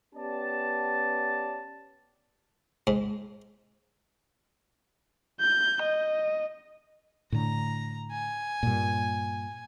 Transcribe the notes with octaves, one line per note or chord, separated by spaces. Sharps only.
B3 C#4 G4 D5 A5
G#2
G6
D#5
A2 D3 A#5
G#5
G2 A#2